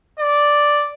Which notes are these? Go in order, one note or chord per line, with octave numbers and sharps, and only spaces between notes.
D5